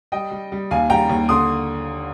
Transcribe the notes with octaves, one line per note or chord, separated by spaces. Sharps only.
G3 D#5 G5
G3
G3
D#2 F5 G#5
G3 G5 A#5
D#2
D3 C6 D#6